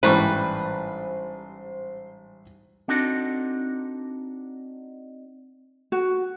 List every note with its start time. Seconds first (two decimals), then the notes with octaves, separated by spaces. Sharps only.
0.03 A1 G#2 G3 B4 C5 C#6
2.88 C4 D4 D#4 F#4 A4
5.92 F#4